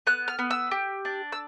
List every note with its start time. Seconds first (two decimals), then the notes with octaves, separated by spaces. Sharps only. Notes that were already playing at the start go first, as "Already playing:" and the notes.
0.07 B3 F#6
0.28 F6
0.39 B3
0.50 E6
0.71 G4
1.05 D4
1.32 E6